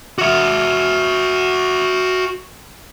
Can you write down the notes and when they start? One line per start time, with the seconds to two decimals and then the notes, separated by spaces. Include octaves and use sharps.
0.18 F#4 E5